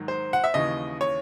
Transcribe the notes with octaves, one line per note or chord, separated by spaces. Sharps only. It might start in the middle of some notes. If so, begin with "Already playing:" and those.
Already playing: G#2 D#3 F#3
C5
F#5
E5
D#2 C#3 E3 D#5
C#5